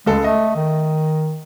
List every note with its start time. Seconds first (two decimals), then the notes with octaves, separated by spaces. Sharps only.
0.06 C#2 G#3 A4
0.24 A3 D#5
0.56 D#3